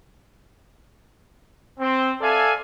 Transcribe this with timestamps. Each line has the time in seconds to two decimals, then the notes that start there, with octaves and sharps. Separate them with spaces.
1.79 C4
2.21 A4 D5 E5 F5 G#5